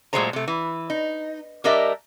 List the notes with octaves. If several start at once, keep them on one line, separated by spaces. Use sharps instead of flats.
A#2 F#3 G#3 A3 C5 A#5
C3 A3
E3
D#4
G3 D4 G4 A#4 D#5 E5